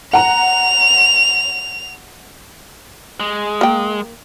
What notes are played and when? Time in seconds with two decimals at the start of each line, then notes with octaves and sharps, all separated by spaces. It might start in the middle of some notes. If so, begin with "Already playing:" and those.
0.13 F#5 A#5 F7
3.20 G#3
3.61 A#3 G5